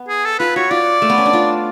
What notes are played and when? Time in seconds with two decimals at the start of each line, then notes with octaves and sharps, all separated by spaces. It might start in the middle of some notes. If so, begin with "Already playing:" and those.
Already playing: B3
0.08 G#4
0.25 A4
0.39 F4 B4
0.56 F#4 C#5
0.71 F4 D5
1.02 A3
1.10 B3
1.18 C#4
1.26 D4
1.33 F4